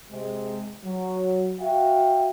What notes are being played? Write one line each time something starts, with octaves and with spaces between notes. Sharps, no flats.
C3 G#3
F#3
F#4 E5 F5 G5